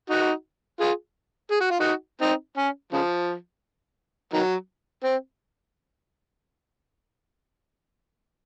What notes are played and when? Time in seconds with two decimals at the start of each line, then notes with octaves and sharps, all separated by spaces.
0.10 D#4 F#4
0.80 F4 G#4
1.51 G#4
1.61 F#4
1.70 F4
1.79 D#4 F#4
2.21 C4 D#4
2.57 C#4
2.93 C#3 F3
4.33 D#3 F#3
5.04 C4